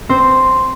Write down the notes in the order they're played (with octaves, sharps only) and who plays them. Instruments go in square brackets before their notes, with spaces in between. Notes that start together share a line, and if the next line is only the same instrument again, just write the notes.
[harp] C4 C5